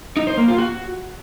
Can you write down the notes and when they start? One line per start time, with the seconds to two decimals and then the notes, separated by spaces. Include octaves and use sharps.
0.17 D#4
0.27 C5
0.37 A#3
0.48 F4
0.58 F#4